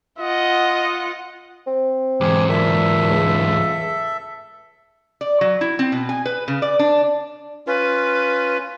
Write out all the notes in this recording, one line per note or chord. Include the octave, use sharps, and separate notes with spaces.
F4 D#5 F#5
C4
E2 G#2 G4 G#4
A#2 A4 E5
C#2
D5
F#3
E4
C4
B2
G#5
B4
C#3
D5
D4
C#4 F4 B4